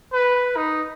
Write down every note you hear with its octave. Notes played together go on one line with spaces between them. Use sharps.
B4
D#4